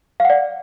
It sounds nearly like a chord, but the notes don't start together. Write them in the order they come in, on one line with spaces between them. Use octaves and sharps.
F5 F#5 D5